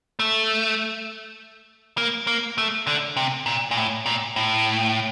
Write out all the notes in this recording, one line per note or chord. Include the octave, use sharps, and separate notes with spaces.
A3
A#3
A#3
A3
D3
C3
A#2
A#2
A2
A#2
A2